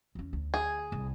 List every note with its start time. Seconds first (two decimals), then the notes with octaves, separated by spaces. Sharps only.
0.15 E2 C#4
0.33 D2
0.54 G#4
0.92 C2